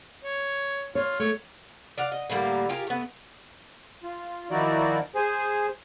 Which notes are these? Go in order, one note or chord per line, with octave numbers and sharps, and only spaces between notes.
C#5
F4 C#5
A3 C#5
D5 F5 F#5
D#5
A2 D3 G3 A#3
F4 G4 G#4 A#4
A3 B3
F4
D#3 F3 D#4 E4 F#4 D5
G#4 C5 G#5